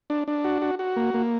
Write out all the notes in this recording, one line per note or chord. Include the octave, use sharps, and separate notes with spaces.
D4
D4
F#4
F#4
F#4
A#3
A#3